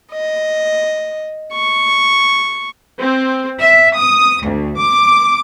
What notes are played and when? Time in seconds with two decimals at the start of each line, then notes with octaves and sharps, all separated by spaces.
0.12 D#5
1.53 C#6
2.99 C4
3.59 E5
3.96 D#6
4.45 D2
4.76 D6